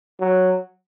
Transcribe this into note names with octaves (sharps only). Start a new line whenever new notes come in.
F#3